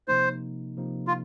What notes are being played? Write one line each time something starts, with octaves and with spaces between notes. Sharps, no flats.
C3 F3 A#3 D#4 C5
C3 F3 A#3 D#4
F4